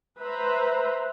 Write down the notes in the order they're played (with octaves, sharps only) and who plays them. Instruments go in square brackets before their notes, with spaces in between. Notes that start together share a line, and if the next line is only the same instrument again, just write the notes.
[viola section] B4 C5 E5 A#5